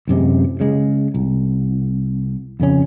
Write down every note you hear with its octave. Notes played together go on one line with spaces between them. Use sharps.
A1 F#2 C3 G#3
C#3 G#3
C2
F2 C#3 C#4